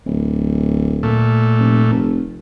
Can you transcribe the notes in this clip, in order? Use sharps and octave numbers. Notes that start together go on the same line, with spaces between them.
D1
A#2 A3
F1
F1